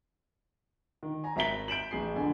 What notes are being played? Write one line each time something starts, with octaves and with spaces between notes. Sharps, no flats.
D#3
G#5 A#5
G#1 E5 A#5 B6 G7
G6 D7 E7 F#7
A1 G#4 C7
F1 D3 G#5